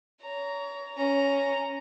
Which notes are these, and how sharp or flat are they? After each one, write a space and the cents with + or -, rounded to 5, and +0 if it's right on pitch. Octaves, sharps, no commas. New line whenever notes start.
C#5 +30 A#5 +0
C#4 +5 A#5 +0